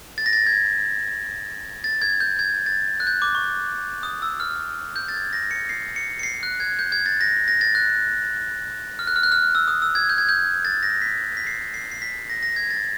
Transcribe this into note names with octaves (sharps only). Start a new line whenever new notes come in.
A6
A#6
A6
G#6
A6
G#6
G6
G#6
A6
F#6
G6
D6
C#6
D#6
E6
F6
G6
A6
G#6
A#6
C#7
C7
C#7
C#7
C7
F#6
G#6
G6
G#6
A6
A#6
A#6
A6
F#6
F6
F#6
F6
F#6
F6
E6
D#6
E6
G#6
G6
G#6
G6
A6
A#6
B6
B6
C7
C7
C7
B6
A#6
A#6
G#6
A6